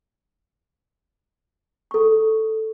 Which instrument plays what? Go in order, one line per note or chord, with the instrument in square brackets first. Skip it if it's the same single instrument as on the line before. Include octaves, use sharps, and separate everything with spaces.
[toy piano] A4 C#6